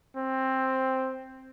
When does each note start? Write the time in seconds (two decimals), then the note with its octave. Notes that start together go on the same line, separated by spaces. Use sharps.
0.16 C4